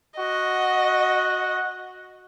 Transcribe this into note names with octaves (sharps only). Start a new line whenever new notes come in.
F#4 D#5 F#5